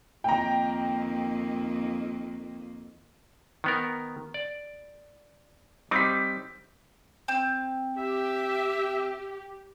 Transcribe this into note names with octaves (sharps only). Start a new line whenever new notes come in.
F2 D#3 A#3 G5 A#5
D#3 B3 A#4
D5
G3 C4 D#4 D6 B6
C4
G4 E5